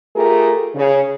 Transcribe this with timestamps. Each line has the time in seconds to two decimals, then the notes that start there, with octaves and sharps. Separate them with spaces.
0.16 A3 F4 G4 G#4 A#4
0.75 C#3